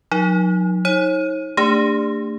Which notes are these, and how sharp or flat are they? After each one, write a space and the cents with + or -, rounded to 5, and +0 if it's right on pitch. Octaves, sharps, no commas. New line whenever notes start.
F#3 -35 D#4 -5
D#4 +30 C#5 -40
A3 +30 D4 +0 G4 +40